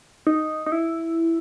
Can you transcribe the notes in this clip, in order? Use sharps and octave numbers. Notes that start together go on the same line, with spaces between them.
D#4
D#4
E4